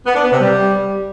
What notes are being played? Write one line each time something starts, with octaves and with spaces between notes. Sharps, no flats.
B3
D4
B3
C3
G3